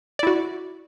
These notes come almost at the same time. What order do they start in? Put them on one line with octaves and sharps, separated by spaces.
D5 E4 F#4